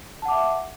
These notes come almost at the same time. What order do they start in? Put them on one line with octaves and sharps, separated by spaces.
A5 F#5 D6 E5